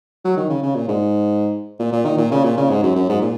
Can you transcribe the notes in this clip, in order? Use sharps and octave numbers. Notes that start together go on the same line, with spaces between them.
F#3
D#3
C#3
C#3
A#2
G#2
A#2
A#2
D#3
A#2
C#3
A#2
C#3
G#2
F#2
F#2
G#2
A#2